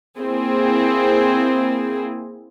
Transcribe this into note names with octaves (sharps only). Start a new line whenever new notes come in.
A#3 C4 E4 G#4